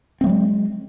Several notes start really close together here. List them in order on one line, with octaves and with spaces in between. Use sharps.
C4 A3 F#3 G#3